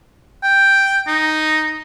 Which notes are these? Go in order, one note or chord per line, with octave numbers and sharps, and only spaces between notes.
G5
D#4